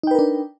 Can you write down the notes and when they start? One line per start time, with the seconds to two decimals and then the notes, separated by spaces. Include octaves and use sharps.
0.03 D#4
0.07 G5
0.11 B4
0.15 A#4
0.19 D4